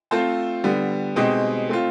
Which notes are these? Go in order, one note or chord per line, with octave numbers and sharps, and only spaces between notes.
A3 C4 F4 A4 C5
D3 G3 B3
B2 G#3 C4 D#4 G4
A3 C4 F4